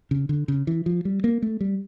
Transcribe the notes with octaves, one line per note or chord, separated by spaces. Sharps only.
C#3
D3
C#3
E3
F3
G3
A#3
A3
G3